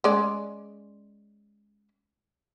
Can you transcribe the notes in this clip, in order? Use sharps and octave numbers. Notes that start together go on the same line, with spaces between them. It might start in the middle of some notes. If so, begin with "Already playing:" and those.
G#3 C#4 D5